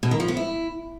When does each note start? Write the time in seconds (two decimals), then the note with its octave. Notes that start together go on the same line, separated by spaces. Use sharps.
0.03 B2
0.11 D#3
0.20 F3
0.28 B3
0.37 E4